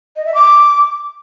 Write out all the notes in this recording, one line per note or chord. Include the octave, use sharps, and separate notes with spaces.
D#5
E5
D6